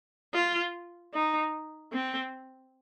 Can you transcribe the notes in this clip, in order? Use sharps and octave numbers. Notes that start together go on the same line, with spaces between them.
F4
D#4
C4